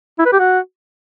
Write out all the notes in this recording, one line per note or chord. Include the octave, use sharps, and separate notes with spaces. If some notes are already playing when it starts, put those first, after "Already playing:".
E4
B4
G4
F#4